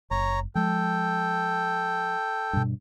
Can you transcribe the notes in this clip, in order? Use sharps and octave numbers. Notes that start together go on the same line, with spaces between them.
F#1 C#5 A#5
F3 G#3 A4 G5
G2 B2